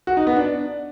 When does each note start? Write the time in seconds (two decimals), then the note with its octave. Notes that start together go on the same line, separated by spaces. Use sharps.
0.07 F#4
0.17 D#4
0.27 B3
0.36 D4